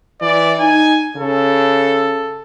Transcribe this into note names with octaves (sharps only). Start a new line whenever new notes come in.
E3 D5
D#4 G#5
C#3 A4